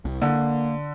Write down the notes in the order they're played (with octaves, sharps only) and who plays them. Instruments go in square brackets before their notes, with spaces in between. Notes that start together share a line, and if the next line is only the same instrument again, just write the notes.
[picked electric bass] C2
[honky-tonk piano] D3 [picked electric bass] A#3